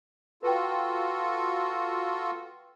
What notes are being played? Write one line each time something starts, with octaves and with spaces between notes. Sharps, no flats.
F4 F#4 A4 B4 G5